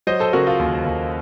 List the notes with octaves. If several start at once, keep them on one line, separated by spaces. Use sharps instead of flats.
F#3 C5 D#5
A4 C5
C#3 F#4 A#4
F4 A4
D#2
D#2